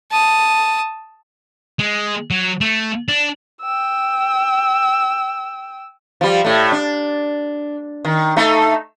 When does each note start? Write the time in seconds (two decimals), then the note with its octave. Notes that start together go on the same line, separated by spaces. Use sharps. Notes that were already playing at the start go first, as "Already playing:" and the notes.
0.11 A5 D#6
1.80 G#3
2.30 F#3
2.61 A3
3.08 D4
3.62 G5 E6
6.21 F3 G3
6.45 A2 A3
6.72 D4
8.05 D#3
8.37 A3 D#4 A4